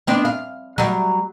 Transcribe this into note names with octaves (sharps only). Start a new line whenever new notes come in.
B3 C4 D4
F5
F#3 G3